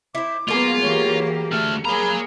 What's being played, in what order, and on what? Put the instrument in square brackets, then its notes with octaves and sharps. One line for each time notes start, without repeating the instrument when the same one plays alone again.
[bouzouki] E4 C5 [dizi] D6
[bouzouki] F#3 G#4 [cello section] A#3 B3 [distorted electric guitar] F4
[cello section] E3 A#3 G4 [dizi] C#5
[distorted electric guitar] D3 A3 [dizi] F6
[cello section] A#3 G#4 [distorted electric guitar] C#5 A#5 [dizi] B5